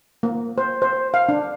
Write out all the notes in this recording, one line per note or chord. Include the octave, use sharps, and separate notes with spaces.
A#3
C5
C5
F5
D4